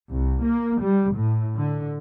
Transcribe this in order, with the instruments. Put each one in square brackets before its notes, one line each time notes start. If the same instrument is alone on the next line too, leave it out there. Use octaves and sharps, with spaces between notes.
[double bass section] C2
A#3
G3
A2
D3